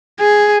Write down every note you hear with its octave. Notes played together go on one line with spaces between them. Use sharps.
G#4